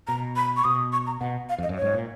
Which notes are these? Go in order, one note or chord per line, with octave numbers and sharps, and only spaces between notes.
B2 A#5
B5
C#6
B2 D#6
C#6
A#5
B2 F#5
F5
F2 D#5
F#2
G#2 C#5
A#2